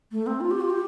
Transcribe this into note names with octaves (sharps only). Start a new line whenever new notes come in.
A3
C4
F4
G4
F4
G4